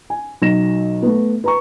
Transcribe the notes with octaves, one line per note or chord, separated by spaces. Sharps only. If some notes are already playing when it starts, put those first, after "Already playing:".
G#5
B1 F#3 A#6 E7
A3 B3
B4 A#5 C#6